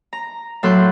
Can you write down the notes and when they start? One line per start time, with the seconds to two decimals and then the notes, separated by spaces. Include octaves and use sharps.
0.13 A#5
0.63 A2 F#3 A4 C6 F#6 G6